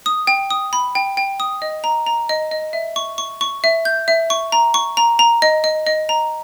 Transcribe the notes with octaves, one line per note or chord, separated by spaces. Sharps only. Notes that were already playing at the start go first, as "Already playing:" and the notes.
D#6
G5
D#6
B5
G5
G5
D#6
D#5
A#5
A#5
D#5
D#5
E5
C#6
C#6
C#6
E5
G6
E5
C#6
A#5
C#6
A#5
A#5
D#5
D#5
D#5
A#5